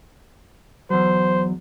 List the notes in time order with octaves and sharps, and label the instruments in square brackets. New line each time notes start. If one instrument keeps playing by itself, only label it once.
[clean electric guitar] E2 F#3 [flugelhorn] C5